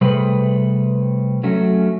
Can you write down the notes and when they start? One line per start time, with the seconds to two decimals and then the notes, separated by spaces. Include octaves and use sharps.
0.01 C3 G3 A3 G#4 B4
1.43 F#3 A3 C#4